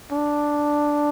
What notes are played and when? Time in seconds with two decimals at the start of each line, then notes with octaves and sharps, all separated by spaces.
0.12 D4